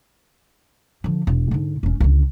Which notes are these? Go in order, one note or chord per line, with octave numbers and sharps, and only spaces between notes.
D3 F3
E1
G#2 D3
E1 C#4
C#2 D3